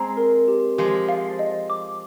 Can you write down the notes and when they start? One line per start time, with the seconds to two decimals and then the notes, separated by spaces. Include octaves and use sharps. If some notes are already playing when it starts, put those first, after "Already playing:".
Already playing: G#3 C4 A#5
0.17 A#4
0.48 G4
0.78 F3 G#3 G4
1.09 F5
1.39 D#5
1.70 D6